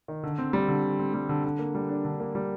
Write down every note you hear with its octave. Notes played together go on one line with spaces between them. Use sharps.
D#3
D3
C4
G3
D3
D3
C4
G3
D3
D3
A#3
G3
D4
D3
A#3
G3